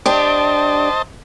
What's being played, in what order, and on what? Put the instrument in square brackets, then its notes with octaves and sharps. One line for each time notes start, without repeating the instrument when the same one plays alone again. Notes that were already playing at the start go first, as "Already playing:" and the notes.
[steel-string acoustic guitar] D4 G4 [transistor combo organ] C5 D#5 A5